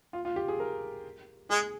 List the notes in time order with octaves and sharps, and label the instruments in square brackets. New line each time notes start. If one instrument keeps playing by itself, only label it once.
[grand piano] F4
F4
G4
G#4
A#4
[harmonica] G#3 [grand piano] G#4